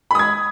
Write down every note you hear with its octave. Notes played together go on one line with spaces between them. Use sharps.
B5 D#6 G#6